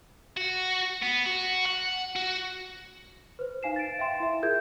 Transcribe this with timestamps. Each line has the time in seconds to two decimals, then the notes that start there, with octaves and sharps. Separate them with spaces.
0.37 F#4
1.02 B3
1.26 F#4
1.66 F#5
2.16 F#4
3.39 B4 C5
3.63 D#4 F5 G#5 C7 E7
3.76 A6 D7
3.98 E5 F5 G5 C6 E7
4.20 E4 E5
4.42 F4 G#4 A#4 E5 G6 G#6